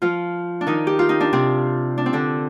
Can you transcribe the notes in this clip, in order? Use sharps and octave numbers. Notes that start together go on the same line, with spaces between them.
F3 F4
D4
D#3 D#4
G4
F4
D#4
D4
C3 C4
D4
C4
D3 D4